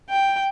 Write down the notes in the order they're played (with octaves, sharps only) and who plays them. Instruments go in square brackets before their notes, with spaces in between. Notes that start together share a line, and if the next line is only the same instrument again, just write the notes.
[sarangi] G5